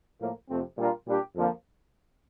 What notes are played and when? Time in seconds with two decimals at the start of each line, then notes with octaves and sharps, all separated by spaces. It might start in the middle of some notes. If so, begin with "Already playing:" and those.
0.20 A2 F3 A#3
0.49 F2 C3 F3 A3 C4
0.78 A#2 G3 D4 F4 A#4
1.07 A#2 G3 D4 G4
1.35 F2 D3 F3 A#3